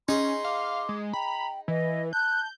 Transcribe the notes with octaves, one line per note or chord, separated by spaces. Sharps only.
C#4 D#4 G#4 C6
F5 D6
G#3
G5 A#5 B5
E3 B4 D#5
A5 F#6 G6